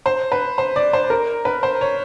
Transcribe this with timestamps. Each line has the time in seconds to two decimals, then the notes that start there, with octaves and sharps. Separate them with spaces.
0.06 C5
0.32 B4
0.58 C5
0.76 D5
0.93 C5
1.10 A#4
1.45 B4
1.63 C5
1.81 C#5